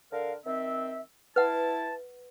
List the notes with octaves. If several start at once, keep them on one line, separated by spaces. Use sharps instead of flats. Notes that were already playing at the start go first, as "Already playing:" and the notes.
D3 A#4 F5
D#3 C4 E5
E4 B4 F#5 A5